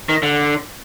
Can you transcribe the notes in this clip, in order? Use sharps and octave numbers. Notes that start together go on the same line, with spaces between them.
D#3
D3